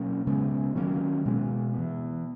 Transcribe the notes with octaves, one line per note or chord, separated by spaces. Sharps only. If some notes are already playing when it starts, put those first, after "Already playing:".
Already playing: B2 F#3 A#3 C#4
C#3 G#3 B3
D#3 F#3 A#3 C#4
B2 G#3 B3
E3 B3